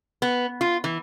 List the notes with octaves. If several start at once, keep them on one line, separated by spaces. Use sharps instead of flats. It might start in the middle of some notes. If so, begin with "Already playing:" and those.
B3
F4
E3